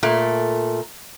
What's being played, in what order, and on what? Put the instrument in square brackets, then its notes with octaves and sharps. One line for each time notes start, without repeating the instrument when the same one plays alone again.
[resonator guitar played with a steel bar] A#2 A3